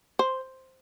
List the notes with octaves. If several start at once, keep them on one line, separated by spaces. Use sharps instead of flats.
C5